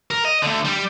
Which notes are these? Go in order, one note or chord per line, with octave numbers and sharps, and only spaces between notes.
A#4
D#5
D3 A3
G3